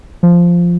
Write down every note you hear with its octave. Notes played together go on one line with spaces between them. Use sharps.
F3